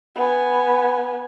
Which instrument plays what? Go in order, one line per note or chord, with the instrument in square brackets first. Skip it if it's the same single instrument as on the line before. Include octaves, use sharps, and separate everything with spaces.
[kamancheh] B3 G#5